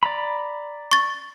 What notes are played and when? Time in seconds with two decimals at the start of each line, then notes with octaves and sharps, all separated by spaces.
0.03 D5 A#5 B5
0.91 C#6 A6